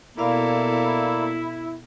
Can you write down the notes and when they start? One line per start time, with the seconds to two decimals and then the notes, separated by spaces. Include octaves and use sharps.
0.19 B2 A#3 E4 A4 D5 F5